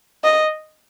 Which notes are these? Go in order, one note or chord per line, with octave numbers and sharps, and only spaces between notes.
D#5